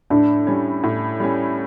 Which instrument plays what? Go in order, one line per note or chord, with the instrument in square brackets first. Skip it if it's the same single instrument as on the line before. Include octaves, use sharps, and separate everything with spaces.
[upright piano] A2 [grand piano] D4
[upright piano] G3 C#4
A2
G3 C#4